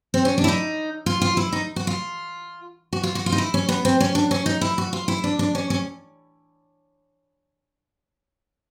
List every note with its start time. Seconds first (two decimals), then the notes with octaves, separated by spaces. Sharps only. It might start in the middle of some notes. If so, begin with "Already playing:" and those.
0.14 C4
0.25 C#4
0.38 D4
0.44 E4
0.48 D#4
1.06 F4
1.21 F4
1.37 E4
1.52 D#4
1.76 F#4
1.87 F4
2.93 F#4
3.03 F4
3.15 F#4
3.26 F4
3.32 D#4
3.38 E4
3.54 C#4
3.69 B3
3.85 C4
4.00 C#4
4.15 D4
4.31 C#4
4.46 D#4
4.61 E4
4.78 F#4
4.93 F4
5.08 E4
5.24 D4
5.39 D4
5.55 C#4
5.70 C#4